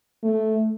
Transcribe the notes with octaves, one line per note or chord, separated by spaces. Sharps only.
A3